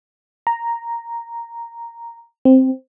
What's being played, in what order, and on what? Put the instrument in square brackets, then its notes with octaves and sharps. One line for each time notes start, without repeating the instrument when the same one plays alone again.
[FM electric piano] A#5
C4